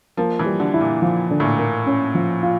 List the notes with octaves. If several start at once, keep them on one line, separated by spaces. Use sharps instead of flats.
F3 A#3
E3
G3
D3
E4
A#2
F3
D3
A2
A#2
A#3
C#4
F3
F4